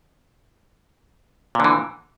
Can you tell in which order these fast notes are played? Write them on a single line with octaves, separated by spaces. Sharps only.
A#2 D3 E3